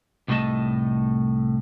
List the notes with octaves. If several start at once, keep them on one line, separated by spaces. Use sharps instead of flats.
C2 A2 A3 D#4 D#5 A5